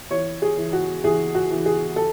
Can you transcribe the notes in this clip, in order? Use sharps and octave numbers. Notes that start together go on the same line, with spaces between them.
E3 C#5
G#4
E3
F#4
E3 G#4
F#4
E3
G#4
A4